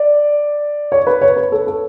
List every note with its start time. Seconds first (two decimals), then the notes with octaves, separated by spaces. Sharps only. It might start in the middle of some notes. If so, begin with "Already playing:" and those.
Already playing: D5
0.92 C#5
1.07 B4
1.21 C#5
1.37 B4
1.52 A4
1.67 A4